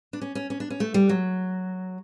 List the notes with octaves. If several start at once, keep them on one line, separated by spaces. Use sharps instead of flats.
D4
C#4
C#4
C#4
D4
C#4
A3
G3
F#3